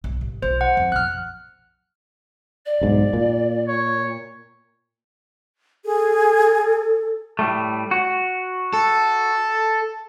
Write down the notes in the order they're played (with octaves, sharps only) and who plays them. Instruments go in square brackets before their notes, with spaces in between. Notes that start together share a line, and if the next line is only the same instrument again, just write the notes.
[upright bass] B1
A1
[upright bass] B1 F4 [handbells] C5
[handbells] F#5
[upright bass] F2
[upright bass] A#1 F2 [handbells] F6 F#6
[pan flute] D5
[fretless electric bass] B1 G#2
A#2
[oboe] C#5
[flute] G#4 [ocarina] A4
[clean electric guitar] A2 G3 A3
F#4
[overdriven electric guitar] A4